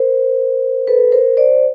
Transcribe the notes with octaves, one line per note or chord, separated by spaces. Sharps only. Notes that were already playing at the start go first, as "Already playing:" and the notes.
Already playing: A#4 C5
A4 B4
A#4 C5
C5 D5